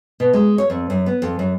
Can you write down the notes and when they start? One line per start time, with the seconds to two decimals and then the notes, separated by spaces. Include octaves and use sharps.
0.20 B2
0.33 G#3
0.58 C#5
0.70 F2
0.90 F#2
1.06 B3
1.22 F2
1.39 F#2